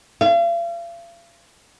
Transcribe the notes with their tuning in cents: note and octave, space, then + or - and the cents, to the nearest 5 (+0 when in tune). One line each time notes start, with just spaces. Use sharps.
F5 -40